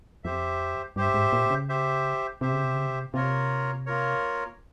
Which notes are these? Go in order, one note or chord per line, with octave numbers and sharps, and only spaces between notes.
F2 G4 C5 E5
G2 G4 C5 E5
G#2
A#2
C#3
G4 C5 E5
C3 G4 C5 E5
C#3
C3
C#3
C3
C3 A#3 F4 A#4 C#5
A#3 F4 A#4 C#5